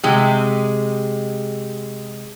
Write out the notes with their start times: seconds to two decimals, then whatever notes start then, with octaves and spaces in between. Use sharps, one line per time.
0.03 C3 G#3